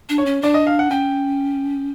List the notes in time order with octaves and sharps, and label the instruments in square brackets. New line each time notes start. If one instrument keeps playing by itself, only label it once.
[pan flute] D4
[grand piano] C#5
[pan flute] C#4
[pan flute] D4 [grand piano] D5
[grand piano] D#5
F5
F#5
[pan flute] C#4 [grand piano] G5